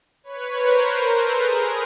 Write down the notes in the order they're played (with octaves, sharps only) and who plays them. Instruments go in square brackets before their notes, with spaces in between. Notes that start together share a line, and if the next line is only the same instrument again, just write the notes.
[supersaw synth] B4 C#5
A#4 C5
A4 B4
G#4 A#4